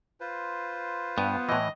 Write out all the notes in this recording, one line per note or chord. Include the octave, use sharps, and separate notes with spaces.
F4 B4 C5
G2 B3
A2 E3 D#5